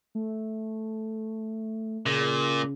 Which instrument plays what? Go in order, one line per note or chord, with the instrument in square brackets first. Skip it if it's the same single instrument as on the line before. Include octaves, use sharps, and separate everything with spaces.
[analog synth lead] A3
[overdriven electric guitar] A#2 [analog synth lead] C#3